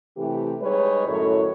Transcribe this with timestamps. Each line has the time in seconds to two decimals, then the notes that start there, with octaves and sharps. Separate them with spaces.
0.17 C3 E3 A3 G4
0.60 G3 G#3 D#4 B4 C#5
1.06 F#2 A2 D#3 E4 A4 C#5